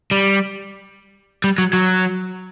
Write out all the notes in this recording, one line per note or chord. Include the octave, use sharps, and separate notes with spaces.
G3
G3
F#3
F#3